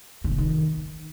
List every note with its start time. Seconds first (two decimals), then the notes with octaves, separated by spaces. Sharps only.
0.24 D3
0.31 C#3
0.38 D#3